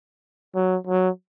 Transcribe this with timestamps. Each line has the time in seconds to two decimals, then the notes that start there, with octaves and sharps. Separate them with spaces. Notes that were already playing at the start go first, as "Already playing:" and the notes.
0.55 F#3
0.87 F#3